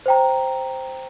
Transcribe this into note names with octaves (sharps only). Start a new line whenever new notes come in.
C5 G5 A#5